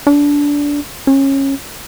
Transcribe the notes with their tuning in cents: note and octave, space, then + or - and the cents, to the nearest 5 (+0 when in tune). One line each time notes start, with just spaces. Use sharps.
D4 -20
C#4 -20